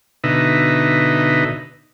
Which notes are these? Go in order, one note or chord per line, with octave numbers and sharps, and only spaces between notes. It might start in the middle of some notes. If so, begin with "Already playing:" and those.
B2 D3 D#4 B4 D#5 E5